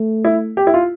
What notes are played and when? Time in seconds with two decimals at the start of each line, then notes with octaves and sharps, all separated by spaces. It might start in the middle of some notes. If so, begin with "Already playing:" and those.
Already playing: A3
0.25 E4
0.57 G4
0.67 E4
0.74 F4